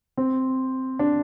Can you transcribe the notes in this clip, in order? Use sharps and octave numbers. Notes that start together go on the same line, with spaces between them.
C4
D4